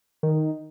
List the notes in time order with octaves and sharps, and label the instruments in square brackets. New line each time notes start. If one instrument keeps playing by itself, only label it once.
[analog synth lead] D#3